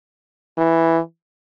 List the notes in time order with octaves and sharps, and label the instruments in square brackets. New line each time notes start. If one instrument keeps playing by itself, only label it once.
[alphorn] E3